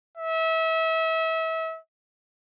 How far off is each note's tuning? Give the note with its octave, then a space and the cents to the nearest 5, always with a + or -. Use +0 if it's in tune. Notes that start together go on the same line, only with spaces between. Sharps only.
E5 -30